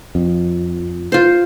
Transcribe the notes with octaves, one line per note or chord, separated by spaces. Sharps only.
F2
F4 C5